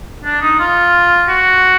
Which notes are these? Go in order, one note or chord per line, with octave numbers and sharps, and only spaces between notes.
D4
D#4
F4
F#4